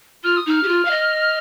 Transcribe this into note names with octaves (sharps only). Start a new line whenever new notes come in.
F4 F6
D#6
D#4 F6
G4
F4
F5
D#5